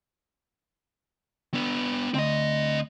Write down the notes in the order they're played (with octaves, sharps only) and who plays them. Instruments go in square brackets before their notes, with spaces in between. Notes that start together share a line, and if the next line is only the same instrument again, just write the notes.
[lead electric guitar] B3 D4
[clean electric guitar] D2 [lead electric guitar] C4 D#5